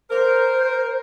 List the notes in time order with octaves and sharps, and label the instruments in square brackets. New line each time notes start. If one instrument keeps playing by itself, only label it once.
[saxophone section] A#4 [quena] C5